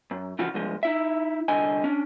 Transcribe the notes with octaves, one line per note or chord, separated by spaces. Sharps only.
F#2
C#3 E3 F3 F4 F#4
C2 G2 F3 G#3
D#4 E4 E5
C2 D3 D#5 G#5
C#4 D4